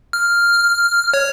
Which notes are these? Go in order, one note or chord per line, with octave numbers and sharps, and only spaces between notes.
F6
C#5